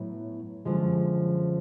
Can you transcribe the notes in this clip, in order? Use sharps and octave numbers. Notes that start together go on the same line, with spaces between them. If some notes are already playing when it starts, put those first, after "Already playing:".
Already playing: A2 F#3 B3 E4
F#2 D3 F3 G#3